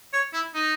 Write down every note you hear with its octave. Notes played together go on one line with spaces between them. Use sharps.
C#5
E4
D#4